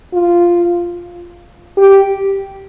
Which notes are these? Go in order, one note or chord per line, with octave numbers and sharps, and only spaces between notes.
F4
G4